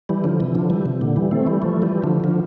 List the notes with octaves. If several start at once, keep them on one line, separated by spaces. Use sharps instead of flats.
E3 G3
D3 F3
C3 E3
D3 F3
E3 G3
C3
A#2 D3
E3 G3
A3 C4
E3 G3
F3 A3
E3 G3
D3 F3
D3 F3